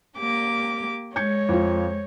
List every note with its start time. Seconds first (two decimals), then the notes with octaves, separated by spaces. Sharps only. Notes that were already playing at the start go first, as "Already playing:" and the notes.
0.17 A#3 G4 D6
1.16 G#3 C#5 G6 G#6 C#7
1.49 F2 F4